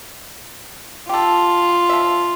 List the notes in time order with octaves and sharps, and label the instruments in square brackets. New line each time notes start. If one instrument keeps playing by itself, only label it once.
[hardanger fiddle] F4 [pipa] G4 A4
[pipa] F3 E5